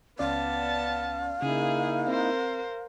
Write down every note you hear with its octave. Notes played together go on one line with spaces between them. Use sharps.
C#2 B3 C#4 D5 F5 A5
C#3 A#3 D#4 E4 G#4
C4 A#4 C5